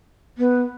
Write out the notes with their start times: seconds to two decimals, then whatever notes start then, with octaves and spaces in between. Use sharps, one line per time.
0.38 B3